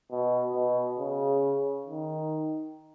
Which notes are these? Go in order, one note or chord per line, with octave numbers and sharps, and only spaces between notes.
B2
B2
C#3
D#3